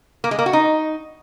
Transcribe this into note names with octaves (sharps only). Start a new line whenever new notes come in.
A#3
G#3
A#3
F#4
D#4